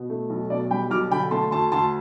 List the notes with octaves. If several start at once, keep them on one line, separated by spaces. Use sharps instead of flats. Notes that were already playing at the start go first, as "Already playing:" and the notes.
Already playing: B2
A3
B1
B2 D5
G3 G5 B5
B1 D6 F6
D3 G5 B5
A3 A5 C6
D2 A5 C6
D2 A5 C6